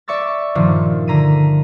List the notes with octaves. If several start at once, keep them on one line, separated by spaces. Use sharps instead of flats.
D5 E5 C#6 E6 A6
G2 A#2 D#3 F3 D4
D3 A#5 B6 D#7